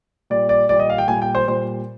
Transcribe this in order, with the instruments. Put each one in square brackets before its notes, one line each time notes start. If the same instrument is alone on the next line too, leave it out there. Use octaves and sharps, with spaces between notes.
[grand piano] A#2 G3 D5
D5
A#2 G3 D5
D#5
F5
G5
A#2 G3 G#5
G5
C5
A#2 G3 C5